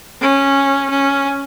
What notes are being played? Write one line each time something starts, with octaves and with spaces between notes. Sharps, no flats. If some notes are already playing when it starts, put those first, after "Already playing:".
C#4
C#4